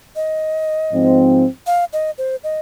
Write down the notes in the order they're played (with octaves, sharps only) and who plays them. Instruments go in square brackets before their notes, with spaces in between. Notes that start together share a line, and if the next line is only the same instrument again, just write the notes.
[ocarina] D#5
[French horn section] G#2 F3 C4
[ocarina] F5
D#5
C5
D#5